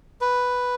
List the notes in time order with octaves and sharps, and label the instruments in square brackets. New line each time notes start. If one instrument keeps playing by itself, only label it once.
[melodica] B4